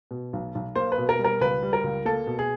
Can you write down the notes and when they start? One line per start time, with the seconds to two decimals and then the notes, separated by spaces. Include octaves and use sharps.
0.11 B2
0.33 B1
0.55 B1
0.75 A#3 C5
0.92 B4
0.98 B2
1.09 A#4
1.19 G3
1.24 A#4
1.41 C#2 B4
1.63 G3
1.73 A#4
1.84 C#2
2.05 A#3 A4
2.27 B2
2.39 G#4